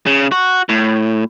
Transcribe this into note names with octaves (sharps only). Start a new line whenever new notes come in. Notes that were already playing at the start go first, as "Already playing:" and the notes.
C#3
F#4
A2